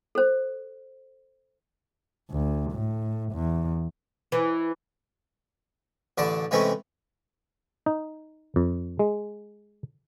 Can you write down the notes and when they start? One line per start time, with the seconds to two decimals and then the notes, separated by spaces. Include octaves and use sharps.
0.15 A4 C5
2.30 D2
2.71 A2
3.32 E2
4.32 E3
6.18 A1 D3 D4 D5 A5
6.51 C3 E3 G#3 A3 C4 C#4
7.86 D#4
8.56 F2
8.99 G#3